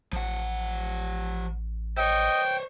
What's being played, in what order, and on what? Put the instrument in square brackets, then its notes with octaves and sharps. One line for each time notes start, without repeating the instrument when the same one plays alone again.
[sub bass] A1 [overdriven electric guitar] F3 F#5
[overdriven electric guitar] C5 C#5 [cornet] D#5 [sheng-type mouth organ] G5